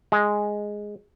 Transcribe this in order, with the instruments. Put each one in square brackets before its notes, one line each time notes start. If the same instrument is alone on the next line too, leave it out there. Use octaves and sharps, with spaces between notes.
[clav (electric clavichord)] G#3